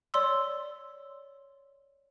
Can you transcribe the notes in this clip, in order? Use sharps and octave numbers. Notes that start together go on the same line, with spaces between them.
C#5 D5 C6 E6